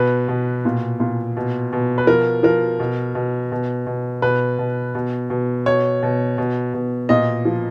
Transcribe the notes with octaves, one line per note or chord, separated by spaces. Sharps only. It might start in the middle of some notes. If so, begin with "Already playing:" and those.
Already playing: B2 B4
B2
A#2
A#2
B2
B2
B4
F3 A#4
F3 A#4
B2
B2
B2
B2
B2 B4
B2
B2
B2
B2 C#5
B2
B2
B2
A#2 D#5
F3